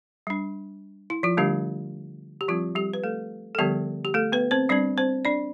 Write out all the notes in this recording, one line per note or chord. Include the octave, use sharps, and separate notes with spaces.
G3 D4
E4
F3 F4
D3 G3 A3 D4 G4
G4
F3 G3 C4 F4
G3 G4
B4
A3 A4
A4
D3 F3 G3 B3 G4
G4
A3 A4
B3 B4
C4 C5
G3 C4 D4 D5
C4 C5
D4 D5